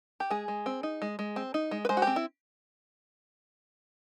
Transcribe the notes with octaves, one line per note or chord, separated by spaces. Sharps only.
G4
G#3 G#4
G#3
C4
D#4
G#3
G#3
C4
D#4
G#3
B4
G#3 C5
F#4
C4 G4
E4